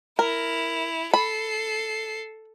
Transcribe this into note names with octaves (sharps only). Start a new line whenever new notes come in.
E4 A#4 F7
A4 B5 C7